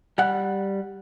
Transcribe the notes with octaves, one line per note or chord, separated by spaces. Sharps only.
G3 F#5